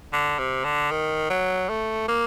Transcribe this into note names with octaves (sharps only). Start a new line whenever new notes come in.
D3
C3
D3
D#3
F#3
A3
A#3